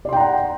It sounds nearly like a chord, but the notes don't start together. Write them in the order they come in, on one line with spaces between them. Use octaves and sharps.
D5 C6 G5 A#5 F#5